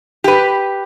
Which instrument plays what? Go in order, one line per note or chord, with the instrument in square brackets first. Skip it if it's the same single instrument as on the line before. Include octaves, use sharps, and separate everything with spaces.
[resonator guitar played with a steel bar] G4 B4